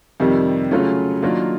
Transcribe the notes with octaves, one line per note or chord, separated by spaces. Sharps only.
F2 C3 D#3 G3
C#3 F#3 A3 C#4 F4
D#3 F#3 A#3 D4 F4